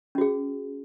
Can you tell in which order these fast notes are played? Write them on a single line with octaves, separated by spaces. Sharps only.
C#4 F#4 G#4